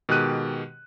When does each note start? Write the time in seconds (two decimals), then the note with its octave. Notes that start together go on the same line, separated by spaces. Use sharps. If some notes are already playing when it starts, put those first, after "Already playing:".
0.09 B2 D#3 G#3 G4 F#6 D#7